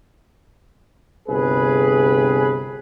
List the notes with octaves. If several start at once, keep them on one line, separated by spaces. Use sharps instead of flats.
G1 C2 G#4 B4